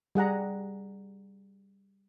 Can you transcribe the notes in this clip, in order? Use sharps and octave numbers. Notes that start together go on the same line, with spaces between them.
G3 G#4 F#5 A#5